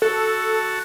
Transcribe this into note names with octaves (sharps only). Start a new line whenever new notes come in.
F#4 A4 A5